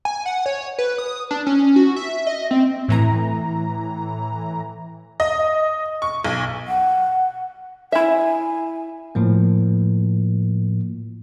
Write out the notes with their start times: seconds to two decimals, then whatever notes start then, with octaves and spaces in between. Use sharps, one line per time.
0.05 G#5
0.26 F#5
0.46 C#5
0.78 B4
0.98 D#6
1.31 D4
1.46 C#4
1.76 F#4
1.96 E5
2.27 D#5
2.51 C4
2.88 A2 E3 A#5
5.20 D#5
6.02 C#6
6.25 B1
6.67 F#5
7.92 E4 E5 G#5
9.15 A2 F3 A#3